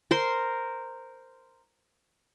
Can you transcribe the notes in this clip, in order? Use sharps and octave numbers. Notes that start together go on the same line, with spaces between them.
A#4 C5 C6